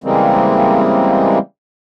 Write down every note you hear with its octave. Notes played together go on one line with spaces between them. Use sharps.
C#3 E3 G3 G#3 A#3 C4